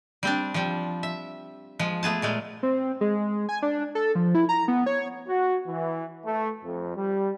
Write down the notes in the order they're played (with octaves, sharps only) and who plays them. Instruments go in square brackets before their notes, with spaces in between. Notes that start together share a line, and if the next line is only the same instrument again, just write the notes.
[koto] G3 C4 D4
F3 G3
E5
F3 G#3
A3 B3 G#4 A5
A#2 G#3 A3
[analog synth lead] C4
G#3
G#5
D4
A4
F3
E4
A#5
B3
C#5
[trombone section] F#4
E3
A3
F2
G3